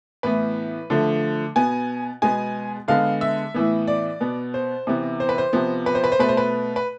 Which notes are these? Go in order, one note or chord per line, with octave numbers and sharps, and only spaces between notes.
A2 E3 B3 B4
D3 F3 A3
B2 B3 G#5
B2 G#3 B3 G#5
D3 G#3 B3 F5
E5
A2 E3 B3
D5
B2 B3
C5
C3 E3 B3
C5
B4
C5
C3 F3 B3
B4
C5
B4
C5
B2 A3 B4
C5
B4
B4